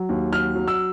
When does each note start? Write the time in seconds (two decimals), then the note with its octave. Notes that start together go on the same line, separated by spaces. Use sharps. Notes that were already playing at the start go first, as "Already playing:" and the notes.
Already playing: F#3
0.09 D#2
0.32 F#3 F6
0.55 F#3
0.68 E6